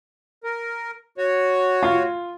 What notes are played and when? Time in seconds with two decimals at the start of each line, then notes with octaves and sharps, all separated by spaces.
0.44 A#4
1.18 F#4 C#5
1.83 F4